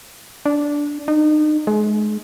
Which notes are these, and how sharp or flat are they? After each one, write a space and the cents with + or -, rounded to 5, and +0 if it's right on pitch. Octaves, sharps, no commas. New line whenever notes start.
D4 -10
D#4 -35
G#3 +30